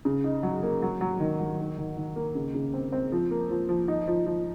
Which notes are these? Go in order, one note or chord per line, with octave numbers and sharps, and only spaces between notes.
C#3
D#4
F#3
A#3
F#3
F#3
D#3
F#3
D#3
D#3
D#3
A#3
C#3
C#3
C4
C4
F3
A#3
F3
F3
D#4
F3
F3